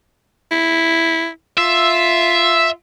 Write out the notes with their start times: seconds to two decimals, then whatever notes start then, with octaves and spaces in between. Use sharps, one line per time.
0.51 E4
1.57 F4 E5